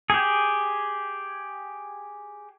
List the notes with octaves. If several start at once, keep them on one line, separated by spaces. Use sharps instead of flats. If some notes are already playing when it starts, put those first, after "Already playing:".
G4 G#4